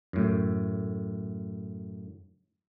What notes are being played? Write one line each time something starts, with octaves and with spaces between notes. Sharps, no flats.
F#2 A2